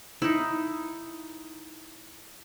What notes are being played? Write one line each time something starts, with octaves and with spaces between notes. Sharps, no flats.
D#4 E4